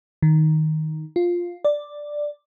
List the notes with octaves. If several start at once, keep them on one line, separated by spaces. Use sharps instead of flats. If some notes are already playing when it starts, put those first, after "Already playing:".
D#3
F4
D5